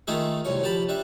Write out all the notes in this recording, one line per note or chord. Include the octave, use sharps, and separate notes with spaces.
D#3 A3 F4 G#4 E5
C2 F#2 C#5
F3 G4 A5 B5
G3 D4 E5